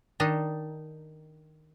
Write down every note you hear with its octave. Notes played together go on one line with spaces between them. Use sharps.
D#3 D4 D#4